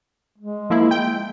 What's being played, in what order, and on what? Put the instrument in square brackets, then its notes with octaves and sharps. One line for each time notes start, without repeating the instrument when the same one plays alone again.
[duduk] G#3
[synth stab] F3 A#3 E4
G5